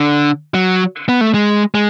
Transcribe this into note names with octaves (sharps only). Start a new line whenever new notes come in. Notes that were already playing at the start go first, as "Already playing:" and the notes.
Already playing: D3
F#3
B3
A3
G#3
G#3